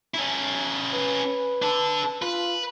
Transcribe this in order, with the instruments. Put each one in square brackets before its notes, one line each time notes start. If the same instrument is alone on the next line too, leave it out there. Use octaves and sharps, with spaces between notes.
[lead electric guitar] C#4 E4
[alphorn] B4
[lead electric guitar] D4 A4
[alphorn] F4 [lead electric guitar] B4